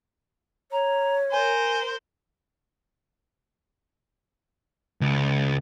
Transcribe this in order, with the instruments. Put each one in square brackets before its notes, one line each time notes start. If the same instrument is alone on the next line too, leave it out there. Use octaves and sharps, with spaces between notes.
[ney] C#5 [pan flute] A#5
[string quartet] A#4 C5 [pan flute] G#5
[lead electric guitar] C#2